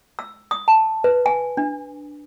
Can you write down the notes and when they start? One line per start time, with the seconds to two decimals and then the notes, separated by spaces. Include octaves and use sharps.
0.19 E6
0.51 D#6
0.68 A5
1.04 B4
1.26 G#5
1.57 D4